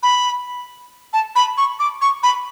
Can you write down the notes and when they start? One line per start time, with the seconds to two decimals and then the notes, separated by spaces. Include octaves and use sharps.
0.03 B5
1.13 A5
1.36 B5
1.58 C#6
1.79 D6
2.01 C#6
2.23 B5